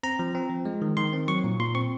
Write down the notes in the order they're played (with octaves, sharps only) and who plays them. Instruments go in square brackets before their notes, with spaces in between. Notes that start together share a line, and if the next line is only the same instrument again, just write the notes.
[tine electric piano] C4 A#5
F3
C4
F3
G#3
D#3
D#3 C6
C4
F#3 C#6
A#2
A#2 C6
C4 C#6